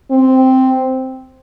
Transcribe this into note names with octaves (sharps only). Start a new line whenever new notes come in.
C4